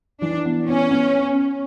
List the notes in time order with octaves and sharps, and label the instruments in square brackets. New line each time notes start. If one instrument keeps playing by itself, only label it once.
[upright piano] E3 [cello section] D4
[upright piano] B3
[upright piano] B3 [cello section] C#4
[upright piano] B3